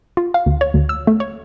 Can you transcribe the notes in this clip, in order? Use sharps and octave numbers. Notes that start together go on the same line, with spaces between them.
F4
F5
D2
C#5
D2
E6
A3
C#5